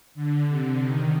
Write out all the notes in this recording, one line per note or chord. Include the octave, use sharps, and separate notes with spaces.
D3
C3
D#3